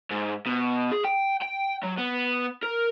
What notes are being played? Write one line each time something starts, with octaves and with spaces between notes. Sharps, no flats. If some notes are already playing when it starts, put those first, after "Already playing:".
G#2
B2
G#4
G5
G5
F#3
B3
A#4